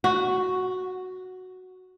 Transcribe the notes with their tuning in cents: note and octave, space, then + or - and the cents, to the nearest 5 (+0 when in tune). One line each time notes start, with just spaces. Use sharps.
F#4 +0